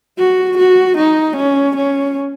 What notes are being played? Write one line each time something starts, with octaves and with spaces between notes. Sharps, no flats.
F#4
F#4
D#4
C#4
C#4